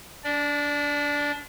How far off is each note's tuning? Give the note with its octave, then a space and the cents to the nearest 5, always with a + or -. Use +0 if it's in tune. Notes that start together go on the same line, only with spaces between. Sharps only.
D4 -25 D5 +0